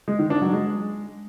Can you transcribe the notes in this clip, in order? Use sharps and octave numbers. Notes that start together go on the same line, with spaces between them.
G#3
D#3
D4
F#3
G#3